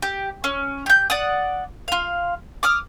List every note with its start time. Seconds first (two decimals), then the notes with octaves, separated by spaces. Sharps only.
0.02 G4
0.44 C#4
0.86 G4 G6
1.10 D5 F#5 D#6
1.88 F4 F5
2.63 D6 D#6 F6